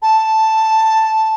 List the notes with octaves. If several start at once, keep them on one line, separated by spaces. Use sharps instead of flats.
A5